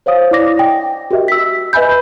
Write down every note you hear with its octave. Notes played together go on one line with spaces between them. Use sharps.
C5 C#5 F5 D#6
E4 D5 D6 A#6
D#5 G5
F#4 G4 A#4 D#5 E5
E6 B6
B4 D#5 E5 G#5 B5 G6